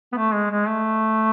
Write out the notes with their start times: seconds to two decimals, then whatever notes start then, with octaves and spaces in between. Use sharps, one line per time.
0.12 B3
0.17 A3
0.33 G#3
0.51 G#3
0.67 A3